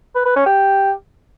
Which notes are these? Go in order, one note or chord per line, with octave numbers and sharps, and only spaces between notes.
B4
B4
C#4
G4